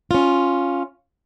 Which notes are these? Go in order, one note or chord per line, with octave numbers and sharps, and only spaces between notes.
C#4 F4